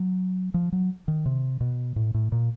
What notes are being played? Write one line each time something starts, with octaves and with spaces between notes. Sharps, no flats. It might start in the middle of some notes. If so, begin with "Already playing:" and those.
Already playing: F#3
F3
F#3
D#3
C3
B2
A2
A2
A#2